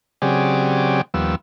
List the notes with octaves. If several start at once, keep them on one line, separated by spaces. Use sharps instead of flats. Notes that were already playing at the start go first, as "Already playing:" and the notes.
C#3 F#3 C4 G4 G#4 D5
D#2 F3 G3 B3 E6